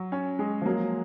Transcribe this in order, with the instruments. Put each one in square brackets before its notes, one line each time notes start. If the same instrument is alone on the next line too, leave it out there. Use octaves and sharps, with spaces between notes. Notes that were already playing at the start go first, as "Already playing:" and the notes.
Already playing: [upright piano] F#3
C#4
G#3
[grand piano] F3
[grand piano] F#3 [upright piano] A#3